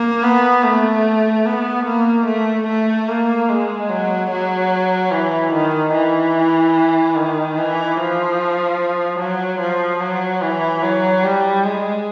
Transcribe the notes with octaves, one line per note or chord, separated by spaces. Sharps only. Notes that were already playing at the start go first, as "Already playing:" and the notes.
Already playing: A#3
B3
A3
B3
A#3
A3
A3
A#3
G#3
F#3
F#3
E3
D#3
E3
D#3
E3
F3
F#3
F3
F#3
E3
F#3
G3
G#3